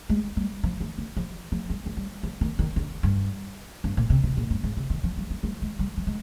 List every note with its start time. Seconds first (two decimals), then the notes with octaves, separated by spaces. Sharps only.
0.10 G#3
0.37 G3
0.64 F3
0.80 D#3
0.98 D3
1.17 F3
1.52 F3
1.70 G3
1.86 F3
1.97 G3
2.23 F3
2.41 D#3
2.59 D#3
2.76 D3
3.03 G2
3.84 G2
3.97 A#2
4.10 C3
4.23 C3
4.37 A#2
4.50 G2
4.63 G#2
4.77 C3
4.90 D#3
5.04 F3
5.17 G3
5.30 F3
5.43 G3
5.62 G#3
5.79 G3
5.97 F3
6.07 G#3